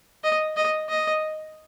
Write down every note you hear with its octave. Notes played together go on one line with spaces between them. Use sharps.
D#5
D#5
D#5